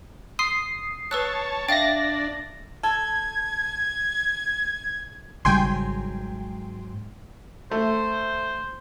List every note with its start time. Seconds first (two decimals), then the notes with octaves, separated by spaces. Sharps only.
0.39 C6 D#6 C7
1.11 B4 C#5 A5 E6 F#6
1.69 D4 E5 F5 G5 A6 A#6
2.83 A4 G#6
5.45 G#1 G#2 C#3 F#3 G3 G5 G#5 C6
7.71 A3 C5